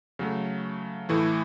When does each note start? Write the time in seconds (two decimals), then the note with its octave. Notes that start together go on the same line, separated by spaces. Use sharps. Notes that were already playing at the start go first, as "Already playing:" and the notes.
0.19 C#3 F#3 A3
1.09 A2 E3 A3 E4